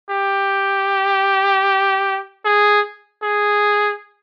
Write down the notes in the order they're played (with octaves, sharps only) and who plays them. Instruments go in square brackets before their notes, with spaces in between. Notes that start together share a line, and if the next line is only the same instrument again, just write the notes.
[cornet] G4
G#4
G#4